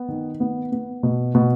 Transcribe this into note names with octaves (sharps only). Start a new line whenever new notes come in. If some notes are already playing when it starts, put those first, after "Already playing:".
Already playing: B3
D#3
B3
B3
B2
B2